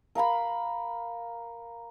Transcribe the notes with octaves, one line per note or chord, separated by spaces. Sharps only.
A#4 F5 A#5 B5